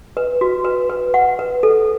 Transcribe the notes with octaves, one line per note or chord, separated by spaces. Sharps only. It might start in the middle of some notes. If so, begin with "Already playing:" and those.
B4
F#4
B4
B4
F#5
B4
A4